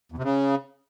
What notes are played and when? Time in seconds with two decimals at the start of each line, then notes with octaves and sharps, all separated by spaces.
0.12 E2
0.18 C3
0.24 C#3